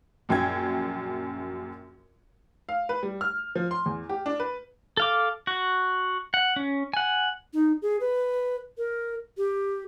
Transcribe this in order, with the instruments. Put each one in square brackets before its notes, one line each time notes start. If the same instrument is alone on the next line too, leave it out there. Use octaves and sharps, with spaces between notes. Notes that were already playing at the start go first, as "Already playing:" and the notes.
[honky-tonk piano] A#1 F#2 G5 G#6
[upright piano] F5
B4
G3
F6
F3
C6
E2
G4
D4
B4
[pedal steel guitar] A4 F5 D6
F#4
F#5
C#4
F#5 G#5
[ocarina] D#4
G#4
B4
A#4
G4